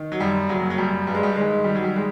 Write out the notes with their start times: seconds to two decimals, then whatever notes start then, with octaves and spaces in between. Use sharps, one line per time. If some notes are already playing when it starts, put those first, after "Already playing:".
Already playing: D#3
0.12 F#3
0.20 F#2 G3
0.49 F#1 F#3
0.70 F#3
0.78 F#2 G3
1.07 G2 G3
1.15 G#3
1.23 G3
1.36 D#3 G#3
1.64 D#3 G3
1.75 F#3
1.84 G3
1.96 G#3